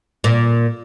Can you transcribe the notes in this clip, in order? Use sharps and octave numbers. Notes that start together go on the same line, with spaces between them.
A#2